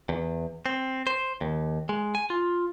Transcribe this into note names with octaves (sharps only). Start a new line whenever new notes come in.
E2
C4
C5
D#2
G#3
G#5
F4